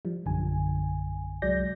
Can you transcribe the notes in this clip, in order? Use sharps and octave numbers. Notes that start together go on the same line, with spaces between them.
F3 G3
A#1 F#2 D3 G#5
C2 F#3 G#3 D5 G6 A#6